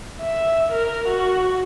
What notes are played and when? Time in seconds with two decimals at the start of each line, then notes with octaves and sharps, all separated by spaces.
0.21 E5
0.72 A#4
1.08 F#4